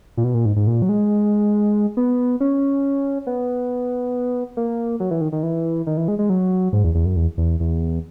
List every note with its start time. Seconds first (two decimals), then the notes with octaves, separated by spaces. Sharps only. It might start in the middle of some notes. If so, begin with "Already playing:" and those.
0.17 A#2
0.24 B2
0.34 A#2
0.45 G#2
0.56 G#2
0.67 A#2
0.82 F#3
0.89 G#3
1.97 B3
2.40 C#4
3.27 B3
4.57 A#3
5.00 F#3
5.11 E3
5.21 D#3
5.32 D#3
5.43 E3
5.87 D#3
5.97 E3
6.08 G#3
6.19 G#3
6.30 F#3
6.73 G#2
6.84 E2
6.95 E2
7.05 F#2
7.16 E2
7.38 E2
7.60 E2